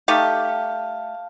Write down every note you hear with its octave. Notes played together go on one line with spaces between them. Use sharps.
A3 D#4 G4 F5 A5 F6